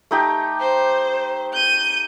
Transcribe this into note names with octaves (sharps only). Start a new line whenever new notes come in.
A3 D#4 G4
C5
G6 D#7